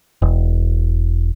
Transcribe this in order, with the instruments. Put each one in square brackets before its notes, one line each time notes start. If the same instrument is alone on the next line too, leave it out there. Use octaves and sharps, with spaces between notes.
[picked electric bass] E1